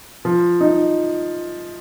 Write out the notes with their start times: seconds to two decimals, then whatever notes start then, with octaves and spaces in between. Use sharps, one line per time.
0.25 F3
0.61 D#4